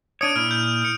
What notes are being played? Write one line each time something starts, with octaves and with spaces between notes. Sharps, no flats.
D4 C#5 D#6 D7 D#7
A#2 E4 F6 D#7
G6
F6 C#7